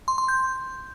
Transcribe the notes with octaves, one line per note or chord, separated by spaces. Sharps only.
C6
C6
G6